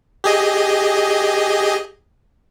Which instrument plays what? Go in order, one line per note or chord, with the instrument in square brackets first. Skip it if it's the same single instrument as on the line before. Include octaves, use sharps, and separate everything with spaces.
[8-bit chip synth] G4 G#4 D#5